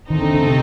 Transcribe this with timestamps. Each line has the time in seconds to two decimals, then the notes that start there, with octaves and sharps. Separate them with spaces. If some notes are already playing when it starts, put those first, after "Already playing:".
0.10 D#3 A3 C4 D#4
0.22 D3
0.34 D3
0.47 C3